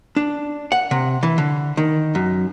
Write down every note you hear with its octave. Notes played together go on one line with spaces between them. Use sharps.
D4
F#5
C3
E3
D3
D#3
F#2